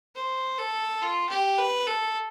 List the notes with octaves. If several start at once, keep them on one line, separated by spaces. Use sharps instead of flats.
C5
A4
F4
G4
B4
A4